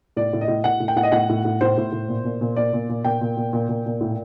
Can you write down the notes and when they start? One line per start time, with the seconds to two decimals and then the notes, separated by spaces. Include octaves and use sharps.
0.16 A2 D5
0.33 A2
0.41 D#5
0.48 A2
0.64 A2 F#5
0.80 A2
0.88 G5
0.96 A2 F#5
1.03 D#5
1.12 A2 F#5
1.29 A2
1.45 A2
1.61 A2 C5
1.77 A2
1.92 A2
2.08 A#2
2.24 A#2
2.41 A#2
2.56 A#2 D5
2.73 A#2
2.89 A#2
3.04 A#2 G5
3.21 A#2
3.37 A#2
3.53 A#2
3.69 A#2
3.86 A#2
4.01 A2